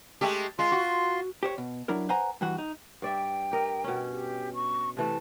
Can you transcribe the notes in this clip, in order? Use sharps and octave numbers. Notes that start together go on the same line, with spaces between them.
G#3 A3 G4
G#3 F4 C6
F#4
G4 C5 C#5
B2
F#3 D4 E4 A#4
B4 C5 F#5 G#5 A#5
G2 E3 F#4
D#4
G2 D5 E5 G5
G4 A#4 D#5
B2 C#4
G4
C#6
C3 E3 A3 A5